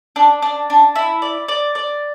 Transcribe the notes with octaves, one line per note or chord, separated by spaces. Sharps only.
D4
D4
D4
E4
D5
D5
D5